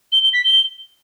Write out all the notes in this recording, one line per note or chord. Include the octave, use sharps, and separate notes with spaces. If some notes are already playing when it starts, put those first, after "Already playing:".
G7
G7
B6
G7